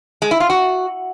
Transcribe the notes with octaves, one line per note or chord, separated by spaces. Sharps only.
G#3
E4
F4
F#4